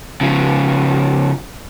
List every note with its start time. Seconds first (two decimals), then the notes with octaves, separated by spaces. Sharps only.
0.21 C#3 F3